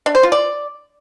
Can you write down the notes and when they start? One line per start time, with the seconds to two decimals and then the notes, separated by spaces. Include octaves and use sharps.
0.06 D4
0.15 C5
0.23 F4
0.32 D5